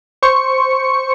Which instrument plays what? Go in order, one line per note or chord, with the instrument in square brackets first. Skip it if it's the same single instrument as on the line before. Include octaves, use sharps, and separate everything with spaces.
[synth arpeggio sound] C5 C#6 C#7